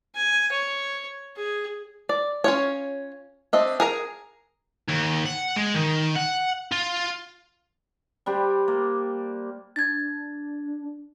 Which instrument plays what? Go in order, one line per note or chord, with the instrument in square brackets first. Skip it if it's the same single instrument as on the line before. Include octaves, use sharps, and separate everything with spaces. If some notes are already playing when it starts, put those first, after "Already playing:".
[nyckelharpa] G#5
C#5
G#4
[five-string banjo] D5
C#4 F4 C#5
C4 D4 D#5 E5
G#4 A#4 A#5
[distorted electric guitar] D#2
F#5
G#3
D#3
F#5
F4
[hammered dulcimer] G3 D4 G4 C5
A#3
[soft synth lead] D4 [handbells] G#6 A6